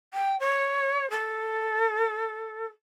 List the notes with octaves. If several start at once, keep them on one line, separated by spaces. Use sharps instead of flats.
G5
C#5
A4